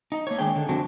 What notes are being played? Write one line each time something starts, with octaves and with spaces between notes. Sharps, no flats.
D#4
A#3 C#5
D#3 G#3 D4 G#4 G5
D3
F3 A3 C4 D4 F#4